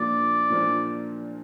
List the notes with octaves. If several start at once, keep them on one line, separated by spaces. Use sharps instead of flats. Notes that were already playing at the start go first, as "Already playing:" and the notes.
Already playing: A#2 F3 A#3 D4 D5
A#2 F3 A#3 D4